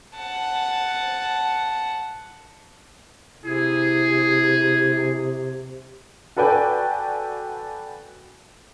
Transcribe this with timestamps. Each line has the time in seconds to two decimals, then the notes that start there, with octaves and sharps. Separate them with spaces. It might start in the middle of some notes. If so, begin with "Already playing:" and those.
0.17 F#5 A5
3.44 C3 E4 G#4
6.37 F#4 A4 B4 D5 G5 G#5